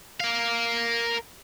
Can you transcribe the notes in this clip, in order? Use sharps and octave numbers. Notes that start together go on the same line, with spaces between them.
A#4 F5